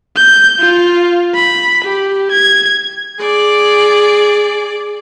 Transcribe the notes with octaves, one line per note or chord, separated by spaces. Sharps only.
G6
F4
B5
G4
G#6
G#4 D5